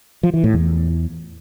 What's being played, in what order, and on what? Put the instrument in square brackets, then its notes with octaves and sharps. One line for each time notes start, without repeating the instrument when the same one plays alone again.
[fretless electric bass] F3
E3
A2
E2